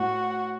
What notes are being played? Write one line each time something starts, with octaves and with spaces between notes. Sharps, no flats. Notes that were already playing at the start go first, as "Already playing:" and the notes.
Already playing: A2 F#4